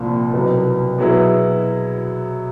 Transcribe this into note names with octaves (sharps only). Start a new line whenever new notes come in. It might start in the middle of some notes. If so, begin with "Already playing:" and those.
Already playing: C2 A#2 F3
C2 B2 F#3 B3
B2 F#3 B3 E4 G#4